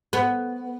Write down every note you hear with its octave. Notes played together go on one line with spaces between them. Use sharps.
B3